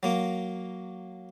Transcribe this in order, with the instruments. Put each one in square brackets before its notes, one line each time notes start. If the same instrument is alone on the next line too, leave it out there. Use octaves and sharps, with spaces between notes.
[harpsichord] F#3 A#3